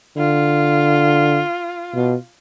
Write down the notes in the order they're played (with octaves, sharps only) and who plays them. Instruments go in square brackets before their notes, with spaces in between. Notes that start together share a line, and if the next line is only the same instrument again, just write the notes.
[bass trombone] D3 [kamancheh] F4
[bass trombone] B2